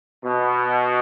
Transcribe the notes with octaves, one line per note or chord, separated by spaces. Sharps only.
B2